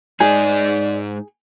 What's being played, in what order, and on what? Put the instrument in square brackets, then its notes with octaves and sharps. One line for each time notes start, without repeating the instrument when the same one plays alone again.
[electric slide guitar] G#2 D#4 [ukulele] G#4 [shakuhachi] D5